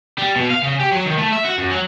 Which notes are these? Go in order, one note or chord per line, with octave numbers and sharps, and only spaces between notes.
G3
B2
F5
C#3
G4
F#3
D#3
A3
E5
F#4
F#2
F#3